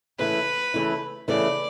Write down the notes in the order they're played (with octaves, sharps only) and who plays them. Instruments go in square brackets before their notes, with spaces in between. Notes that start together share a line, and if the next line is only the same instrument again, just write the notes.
[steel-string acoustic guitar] C#3 E3 A3 E4 [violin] B4
[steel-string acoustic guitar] C#3 E3 A3 E4
[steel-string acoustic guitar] C#3 E3 A3 E4 [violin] D5